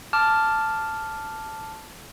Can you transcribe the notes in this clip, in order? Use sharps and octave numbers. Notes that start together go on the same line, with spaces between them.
A5 D6 F6